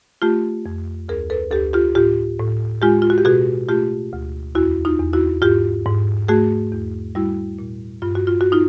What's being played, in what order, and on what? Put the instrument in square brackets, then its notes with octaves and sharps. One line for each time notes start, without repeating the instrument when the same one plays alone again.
[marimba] A3 F4 G4
F2
D2 G#4 A#4
A4 B4
D2 G4 A4
F4 G4
A2 F4 G4
A2
G#3 F4 G4
F4
F#4
G4
B2 F#4 G#4
A3 F4 G4
D2
E2 E4 F#4
D#4 F4
E2
E4 F#4
G#2 F4 G4
G#2
A3 F#4 G#4
E2
G3 E4 F#4
A#2
G2 F4
F#4
F4
F#4
D#4 F4